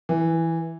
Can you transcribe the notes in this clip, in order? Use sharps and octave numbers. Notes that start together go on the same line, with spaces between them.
E3